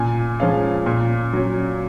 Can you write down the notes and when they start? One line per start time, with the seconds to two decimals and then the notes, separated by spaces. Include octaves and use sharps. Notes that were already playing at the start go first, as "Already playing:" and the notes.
Already playing: A#2 G#5
0.40 F3 G#3 C#4 F5
0.86 A#2
1.33 F#3 C#4